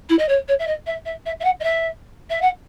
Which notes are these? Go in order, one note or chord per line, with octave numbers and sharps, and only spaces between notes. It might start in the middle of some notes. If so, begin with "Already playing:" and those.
E4
D#5
C#5
C#5
E5
D#5
E5
E5
E5
E5
F#5
D#5
E5
E5
F#5